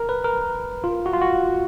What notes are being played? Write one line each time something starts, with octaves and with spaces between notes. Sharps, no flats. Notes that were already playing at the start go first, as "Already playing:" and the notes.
Already playing: A#4
B4
A#4
F4
F#4
F4
F#4